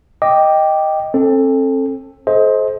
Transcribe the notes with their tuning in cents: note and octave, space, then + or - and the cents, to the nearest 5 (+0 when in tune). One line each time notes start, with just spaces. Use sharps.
D#5 +0 G5 +0 D6 +0
C4 +35 A4 +0
A4 -40 C5 +15 D#5 +25